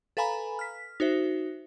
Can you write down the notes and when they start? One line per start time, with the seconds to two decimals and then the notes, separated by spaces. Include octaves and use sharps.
0.17 A4 B4 F5 G#5 A#5 B5
0.59 F6 B6
1.00 D#4 F#4 C5 E5